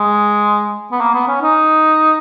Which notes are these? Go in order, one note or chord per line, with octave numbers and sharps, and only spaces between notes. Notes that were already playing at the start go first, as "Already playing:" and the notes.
Already playing: G#3
B3
A#3
B3
C#4
D#4